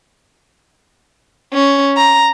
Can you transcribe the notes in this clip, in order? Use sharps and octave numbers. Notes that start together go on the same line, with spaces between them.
C#4
A#5